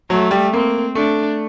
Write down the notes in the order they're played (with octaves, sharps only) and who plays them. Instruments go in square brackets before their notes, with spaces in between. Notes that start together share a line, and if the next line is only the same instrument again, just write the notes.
[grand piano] F#3 [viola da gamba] A3
[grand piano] G3
[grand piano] A#3 [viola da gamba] C4
[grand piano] A3 [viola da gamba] D4